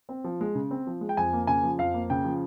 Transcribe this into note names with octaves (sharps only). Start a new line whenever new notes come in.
C4
F3
G#3
C#3
C4
F3
G#3
G5
F2 G#5
A#3
C#3 G#5
F3
F2 F5
A#3
C#3 G5
F3